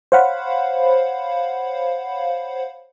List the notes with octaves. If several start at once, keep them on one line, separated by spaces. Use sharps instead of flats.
C5 C#5 F5 F#5 B5